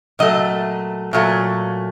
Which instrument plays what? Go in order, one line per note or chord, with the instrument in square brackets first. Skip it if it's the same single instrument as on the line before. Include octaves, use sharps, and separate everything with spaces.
[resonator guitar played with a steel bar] A#2 F#3 A3 D#5
A#2 F#3 A3